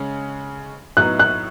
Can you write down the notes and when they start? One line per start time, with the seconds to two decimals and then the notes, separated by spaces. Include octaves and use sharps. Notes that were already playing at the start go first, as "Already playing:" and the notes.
Already playing: C#3 G#3 C#4
0.97 A2 F#3 B3 D#4 F#6
1.19 F#6